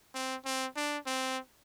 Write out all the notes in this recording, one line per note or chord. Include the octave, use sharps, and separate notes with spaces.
C4
C4
D4
C4